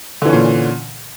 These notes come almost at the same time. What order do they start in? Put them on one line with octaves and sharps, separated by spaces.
D3 E3 C#4 A#2